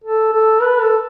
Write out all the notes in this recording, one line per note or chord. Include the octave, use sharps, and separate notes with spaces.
A4
A4
B4
A4